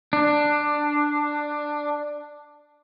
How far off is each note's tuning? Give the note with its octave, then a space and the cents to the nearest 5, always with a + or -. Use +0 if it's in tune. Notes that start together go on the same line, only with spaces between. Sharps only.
D4 +10